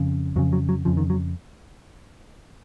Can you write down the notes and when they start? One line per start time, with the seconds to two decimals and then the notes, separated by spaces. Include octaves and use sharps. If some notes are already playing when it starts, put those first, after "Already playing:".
Already playing: F2 C#3
0.36 F2 C#3 F#3
0.53 F#3
0.69 F#3
0.85 F2 C#3 F3
0.97 D#3
1.10 F#3